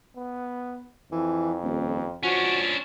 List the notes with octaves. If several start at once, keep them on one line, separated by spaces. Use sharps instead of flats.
B3
F2 E3
D#1
F3 C#4 D4 F#4